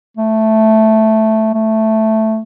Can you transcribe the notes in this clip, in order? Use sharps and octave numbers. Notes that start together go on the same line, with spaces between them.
A3
A3